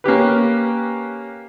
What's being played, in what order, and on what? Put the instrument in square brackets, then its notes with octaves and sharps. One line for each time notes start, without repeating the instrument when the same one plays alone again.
[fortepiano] A#3 C#4 G4 B4